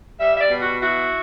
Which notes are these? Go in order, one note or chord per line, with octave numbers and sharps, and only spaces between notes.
G3 E5
E5
D5
B2
F#4
E4 F#4